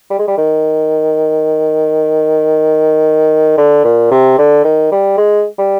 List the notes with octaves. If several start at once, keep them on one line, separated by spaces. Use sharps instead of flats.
G3
G#3
G3
D#3
D3
A#2
C3
D3
D#3
G3
G#3
G3